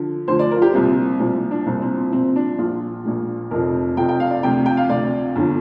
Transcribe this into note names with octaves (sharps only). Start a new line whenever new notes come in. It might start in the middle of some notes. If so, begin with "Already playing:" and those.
Already playing: D3 F3
D2 D3 F3 C5
D5
A#4
F4
G4
C2 A#2 F3 C4
C2 A#2 F3 C4
D4
C2 A#2 F3 C4
C4
C4
C2 A#2 F3 C4
D4
A#1 A#2 F3 F4
A#1 A#2 F3
F1 F2 C3 F3 A#4
F1 F2 C3 F3 G5
G5
F5
D5
D2 C3 F3 G5
G5
F5
D2 C3 F3 D5
G1 D3 F3